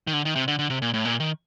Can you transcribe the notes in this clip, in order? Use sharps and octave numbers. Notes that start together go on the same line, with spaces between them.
D#3
D3
D#3
C3
D3
D3
C3
A#2
A2
A#2
D#3